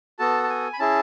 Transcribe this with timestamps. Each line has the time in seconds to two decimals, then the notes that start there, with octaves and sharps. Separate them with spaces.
0.19 B3 F#4 A4 A5
0.43 A5
0.50 G#5
0.73 B5
0.79 C#4 E4 G#4 A5